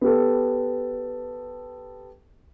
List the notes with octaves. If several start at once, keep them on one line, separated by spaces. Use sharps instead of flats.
B3 G4 A4